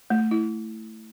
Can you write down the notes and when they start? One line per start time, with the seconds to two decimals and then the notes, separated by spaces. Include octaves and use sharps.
0.10 A3
0.31 E4